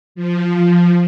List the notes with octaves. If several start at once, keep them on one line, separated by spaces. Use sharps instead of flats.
F3